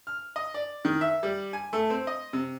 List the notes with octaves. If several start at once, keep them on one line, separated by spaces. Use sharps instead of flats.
F6
D#5
D5
D#3
E5
G3
G#5
A3
C4
D#5
C3